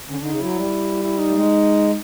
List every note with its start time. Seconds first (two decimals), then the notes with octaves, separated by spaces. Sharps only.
0.09 D3 C#4
0.19 D3
0.24 D#4
0.30 C#3
0.40 F#3 E4
0.56 G3
1.02 E4
1.18 D#4
1.29 A3
1.34 G#3